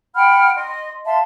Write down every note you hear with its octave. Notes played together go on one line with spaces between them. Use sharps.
F#5 G5 B5 F6
D#5 C6
E5 F5 A5 C6